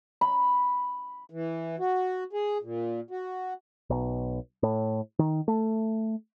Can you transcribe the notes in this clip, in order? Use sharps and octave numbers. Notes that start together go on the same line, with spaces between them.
B5
E3
F#4
G#4
A#2
F#4
B1
A2
D#3
A3